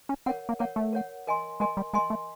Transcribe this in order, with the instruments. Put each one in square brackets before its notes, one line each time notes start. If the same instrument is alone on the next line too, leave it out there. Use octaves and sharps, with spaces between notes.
[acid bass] C#4
[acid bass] C4 [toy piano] A#4 C#5 F#5
[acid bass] A#3
[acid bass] A#3 [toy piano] A#4 C#5 F#5
[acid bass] A3
[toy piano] A#4 C#5 F#5
A#4 D#5 G#5 C6
[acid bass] G#3 [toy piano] A#4 D#5 G#5 C6
[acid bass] G3
[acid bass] G#3 [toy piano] A#4 D#5 G#5 C6
[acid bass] A3